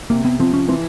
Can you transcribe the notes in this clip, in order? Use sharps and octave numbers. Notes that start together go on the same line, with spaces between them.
C3 A#3
B3
F3 C4
C#4
E3 C4